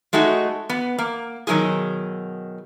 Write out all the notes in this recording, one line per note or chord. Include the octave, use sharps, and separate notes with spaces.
G#3 A3 D#4 F#4
B3
A#3
B2 D#3 F#3 A#3 F4 G#4